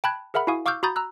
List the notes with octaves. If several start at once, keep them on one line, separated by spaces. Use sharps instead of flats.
G5 A5 B5 F#6 G#6
G#4 A#4 E5 F#5 B5 F6
E4 F#4 F5 G#5 C#6 D#6
F5 C#6 D6 E6 F6 G6
F#4 A#5 B5 D#6 G6 A6
A#5 E6 F#6